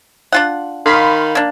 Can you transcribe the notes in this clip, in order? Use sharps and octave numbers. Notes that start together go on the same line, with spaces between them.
D4 F4 F#5
D#3 F5 B5 C6
A#3 D4